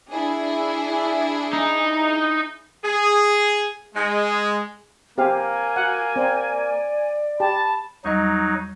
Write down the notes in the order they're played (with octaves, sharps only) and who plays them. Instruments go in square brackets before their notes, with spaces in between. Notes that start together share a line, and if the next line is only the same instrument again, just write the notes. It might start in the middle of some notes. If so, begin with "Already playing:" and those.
[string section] D4 E4 G#4
[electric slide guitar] D#4
[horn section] G#4
G#3
[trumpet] A#3 [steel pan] C4 G4 F5 [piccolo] G#5
[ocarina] F#4 [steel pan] F#5
[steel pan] C4 [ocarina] D5
[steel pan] G4 [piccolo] A5 [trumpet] B5
[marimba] E2 G3 D#5 [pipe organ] F#3 D#4